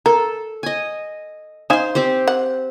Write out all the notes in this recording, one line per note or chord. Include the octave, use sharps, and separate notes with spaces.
A4 A#4
D#5 G#5
D#4 C5 F5 G#5 C6
C4 G4 C5
F#5